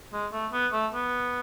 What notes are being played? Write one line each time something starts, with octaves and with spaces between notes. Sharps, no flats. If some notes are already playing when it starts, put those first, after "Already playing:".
G#3
A3
B3
A3
B3